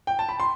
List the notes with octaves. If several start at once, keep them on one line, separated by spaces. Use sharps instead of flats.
G5
A5
B5
C6